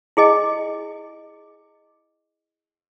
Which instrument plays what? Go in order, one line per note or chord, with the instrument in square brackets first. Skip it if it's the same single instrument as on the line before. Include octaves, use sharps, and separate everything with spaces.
[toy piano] E4 G#4 D#5 G#5